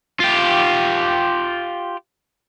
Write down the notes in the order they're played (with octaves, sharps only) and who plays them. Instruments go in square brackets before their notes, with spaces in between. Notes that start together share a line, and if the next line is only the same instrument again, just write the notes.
[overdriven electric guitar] F4 G4